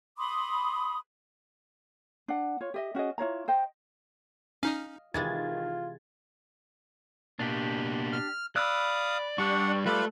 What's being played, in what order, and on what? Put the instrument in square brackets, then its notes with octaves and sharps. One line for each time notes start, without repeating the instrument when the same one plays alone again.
[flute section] B5 C6 D6 D#6
[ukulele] D4 F#5
F4 C#5
G4 D#5 E5
C#4 F#4 G#4 D#5
E4 F4 C#5 A#5
C5 D#5 G5
[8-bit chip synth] C#4 D#4 [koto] D#5 F5
[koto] C3 E3 G#3 [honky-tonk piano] D#3 G#6 A6 [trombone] F4
[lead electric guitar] B2 A#3 [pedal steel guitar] D4 G4
[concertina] F6
[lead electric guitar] D5 [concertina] F5 D#6 [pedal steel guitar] B5 E6 F#6
[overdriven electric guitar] G2 G3 [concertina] D4 F#5 [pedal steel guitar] C#6
[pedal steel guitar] G3 E5 D6 [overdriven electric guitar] A3 A4 [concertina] F4 B4 B5